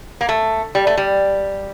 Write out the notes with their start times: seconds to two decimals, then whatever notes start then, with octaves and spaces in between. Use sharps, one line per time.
0.21 A#3
0.29 A3
0.75 G3
0.87 A3
0.97 G3